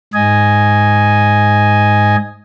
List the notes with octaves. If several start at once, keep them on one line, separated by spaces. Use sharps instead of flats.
G#2 D#5 G#5